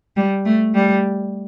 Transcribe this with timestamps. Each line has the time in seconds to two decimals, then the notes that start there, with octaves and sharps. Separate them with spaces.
0.17 G3
0.45 A3
0.74 G3